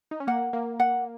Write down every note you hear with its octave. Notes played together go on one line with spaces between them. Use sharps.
D#4
C#4
A#3 F#5
A#3
F#5